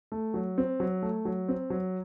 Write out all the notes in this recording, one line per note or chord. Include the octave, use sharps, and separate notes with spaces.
A3
F#3
C4
F#3
A3
F#3
C4
F#3